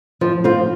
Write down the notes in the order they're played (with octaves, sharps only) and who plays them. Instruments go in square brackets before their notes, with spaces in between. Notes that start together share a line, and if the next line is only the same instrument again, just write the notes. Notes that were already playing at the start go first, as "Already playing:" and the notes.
[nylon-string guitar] F3
C4 F4 C5